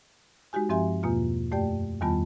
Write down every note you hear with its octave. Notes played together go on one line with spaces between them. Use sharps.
G#3 D#4 F#4 G4 G#5
G2 F3 C4 G4 E5 G#5
E2 B2 A#3 F4
F#2 A3 G4 D5 G5
E2 D#3 G3 B3 F4 A5